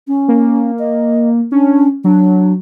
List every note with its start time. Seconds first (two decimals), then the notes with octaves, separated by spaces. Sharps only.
0.08 C#4
0.28 A#3
0.79 D#5
1.52 C#4 D4
2.04 F#3 D4